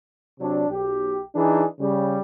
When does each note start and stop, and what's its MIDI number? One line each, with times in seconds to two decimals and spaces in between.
0.40 0.66 48
0.40 0.66 54
0.40 0.66 62
0.69 1.21 35
0.69 1.21 67
1.35 1.64 52
1.35 1.64 62
1.35 1.64 63
1.35 1.64 68
1.79 2.19 49
1.79 2.19 55